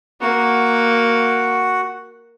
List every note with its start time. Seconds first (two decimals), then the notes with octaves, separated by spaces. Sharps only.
0.21 A#3 F#4 F#5